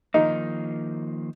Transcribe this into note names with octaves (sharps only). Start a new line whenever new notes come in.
D#3 F3 A#3 D#4